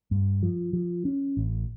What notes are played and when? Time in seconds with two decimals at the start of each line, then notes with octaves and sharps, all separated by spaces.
0.11 G2
0.43 F3
0.73 F3
1.05 C#4
1.37 A1